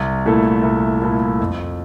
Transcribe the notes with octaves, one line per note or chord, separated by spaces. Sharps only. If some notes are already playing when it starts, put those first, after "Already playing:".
Already playing: C2
A#2 A3 E4 A4
C2
A#2 A3 E4 A4
F2